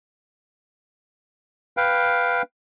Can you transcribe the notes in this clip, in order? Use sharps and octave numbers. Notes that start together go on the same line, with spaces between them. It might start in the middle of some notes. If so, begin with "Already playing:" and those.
B4 F5 G5